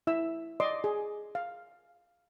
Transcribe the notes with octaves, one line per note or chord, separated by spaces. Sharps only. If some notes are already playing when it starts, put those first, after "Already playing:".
E4 E5 E6
D5 D#5 C6 D6
G#4
F5